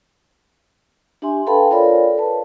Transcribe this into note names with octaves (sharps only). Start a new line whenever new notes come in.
D4 G4 E5 G#5 C6
A4 B4 F5 G5 A5 B5
F4 A4 A#4 C#5 D5 F5
B4 A5